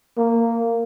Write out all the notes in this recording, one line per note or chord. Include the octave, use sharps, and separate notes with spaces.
A#3